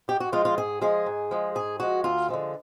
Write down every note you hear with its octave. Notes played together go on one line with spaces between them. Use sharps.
G#2 G4
F#4
F3 G#3 F4
F4
G#2 G#4
F3 G#3 G#4
G#2
F3 G#3
G#2 G#4
F3 G#3 F#4
D2 F4
D3 F3 G#3